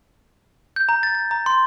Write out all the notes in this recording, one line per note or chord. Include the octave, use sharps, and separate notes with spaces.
G6
A#5
A6
A6
A#5
C6